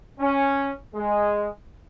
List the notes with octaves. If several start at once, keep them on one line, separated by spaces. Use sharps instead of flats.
C#4
G#3